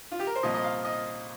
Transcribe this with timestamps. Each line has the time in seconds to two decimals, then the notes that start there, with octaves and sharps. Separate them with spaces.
0.12 F4
0.19 G4
0.27 A#4
0.35 C5
0.43 C2 A#2 F3 D#5
0.54 D#5
0.64 F5
0.85 D#5